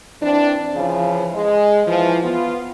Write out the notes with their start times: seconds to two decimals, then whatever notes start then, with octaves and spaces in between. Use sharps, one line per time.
0.22 E3 C4 D4
0.75 C#3 E3 F3
1.33 G#3
1.87 E3 F3
2.23 B3 F4